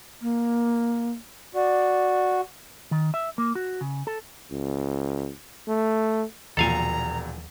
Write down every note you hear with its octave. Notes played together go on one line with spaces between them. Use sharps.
A#3
F#4 D5
D#3
E5
A#3
F#4
C#3
A4
C#2
A3
E1 D#2 A#2 F3 A4 F5 G#5 A#5